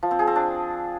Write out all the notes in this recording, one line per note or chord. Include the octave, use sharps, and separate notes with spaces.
F3
C4
G#4
C4
D4